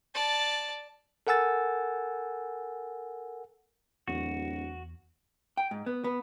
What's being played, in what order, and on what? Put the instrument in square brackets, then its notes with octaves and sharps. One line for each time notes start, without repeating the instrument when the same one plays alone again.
[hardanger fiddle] D5 A5
[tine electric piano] A4 A#4 F#5 G#5 E6 A6
[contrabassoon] D1 [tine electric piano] E2 [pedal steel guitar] F#4
[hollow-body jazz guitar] G5
G#2
B3
B3